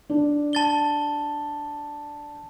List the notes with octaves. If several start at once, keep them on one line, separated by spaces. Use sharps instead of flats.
D4
A5 A6 G7